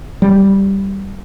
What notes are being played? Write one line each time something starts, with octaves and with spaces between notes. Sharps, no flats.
G3